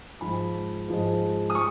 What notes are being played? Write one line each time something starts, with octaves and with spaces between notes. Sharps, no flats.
G#2 F3 G#3 B5
G#2 F3 G#3
D#6
C#6